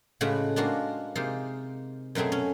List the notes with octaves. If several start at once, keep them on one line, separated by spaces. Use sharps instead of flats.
A2 C#3 G#3 F#4 B4 F#5
G#3 A#3 D4 F4 F#4
C3 G#3 A#3 D#4 F4 C5
F#2 B2 F#3 A3 C4 G#4
C#4